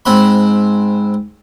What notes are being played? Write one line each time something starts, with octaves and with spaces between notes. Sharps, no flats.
G#2 C4 F#5 B5